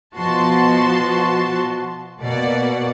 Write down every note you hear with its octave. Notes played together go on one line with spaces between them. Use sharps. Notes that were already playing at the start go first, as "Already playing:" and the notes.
B2 F3 F#4 A5 C6
B2 A#3 D5 F#5